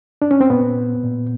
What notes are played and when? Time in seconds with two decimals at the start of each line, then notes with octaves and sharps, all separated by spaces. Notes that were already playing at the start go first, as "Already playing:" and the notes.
0.22 D4
0.31 C#4
0.41 C4
0.50 A#2 B3
1.04 A#2